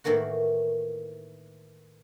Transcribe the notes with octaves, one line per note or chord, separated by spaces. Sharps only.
A2 D#3 E3 A#3 F#4